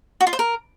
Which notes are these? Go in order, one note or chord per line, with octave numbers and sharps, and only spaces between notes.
F#4
F4
C5
A#4